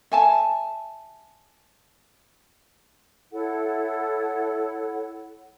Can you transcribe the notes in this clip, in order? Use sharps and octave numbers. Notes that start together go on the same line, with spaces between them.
E5 G#5 A5
E4 A4 C#5 F#5